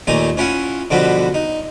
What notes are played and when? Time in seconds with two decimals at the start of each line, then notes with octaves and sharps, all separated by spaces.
0.07 D#2 A#2 A3 D#4 G#5 A#5
0.37 C#4 E4 F4 F#5 G#5
0.90 B2 D3 F3 G3 B3 F#4
1.34 D#4